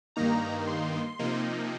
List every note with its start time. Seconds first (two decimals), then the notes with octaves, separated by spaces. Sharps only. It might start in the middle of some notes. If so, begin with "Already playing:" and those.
0.16 G2 D#3 A#3 D#4 A#5
0.67 C6
1.19 C3 F3 A#3 D#4